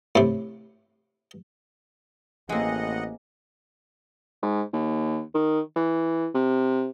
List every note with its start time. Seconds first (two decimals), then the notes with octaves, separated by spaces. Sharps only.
0.15 A2 C3
2.49 A1 G#3 A#3 C4 D#5 F#5
4.43 G#2
4.73 D#2
5.34 D#3
5.76 E3
6.35 C3